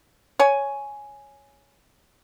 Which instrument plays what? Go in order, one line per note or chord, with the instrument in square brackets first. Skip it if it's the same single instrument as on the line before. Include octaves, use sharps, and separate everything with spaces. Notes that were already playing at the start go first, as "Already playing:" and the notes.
[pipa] C#5 G#5